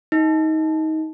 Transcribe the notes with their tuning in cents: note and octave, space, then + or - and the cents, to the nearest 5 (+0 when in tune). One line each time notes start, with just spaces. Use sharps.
D#4 +20